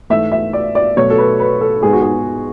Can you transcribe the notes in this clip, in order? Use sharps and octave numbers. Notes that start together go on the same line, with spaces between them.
G#2 E3 A3 E5
E5
D5
D5
B2 F#3 A3 C#5
A4
B4
B4
A4
G#2 G#3 B3 G#4
F#4
G#4